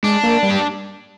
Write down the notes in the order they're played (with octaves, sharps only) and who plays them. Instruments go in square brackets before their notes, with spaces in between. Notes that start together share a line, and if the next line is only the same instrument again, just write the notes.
[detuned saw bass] G#3 [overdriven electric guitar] D4
[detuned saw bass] A#3
G3
[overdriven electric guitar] G4